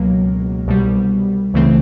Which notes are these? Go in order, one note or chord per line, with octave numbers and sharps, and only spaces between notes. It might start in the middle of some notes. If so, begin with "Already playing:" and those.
Already playing: C#2 B2 F#3 A#3
C2 B2 G3
C#2 C#3 E3 A3 C4